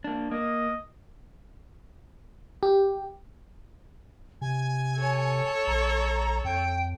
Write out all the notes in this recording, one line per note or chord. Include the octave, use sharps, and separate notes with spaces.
A#3 D4
A#3 D#5
G4
C3 G#5
A4 C#5
A#1 A#5
F2 G5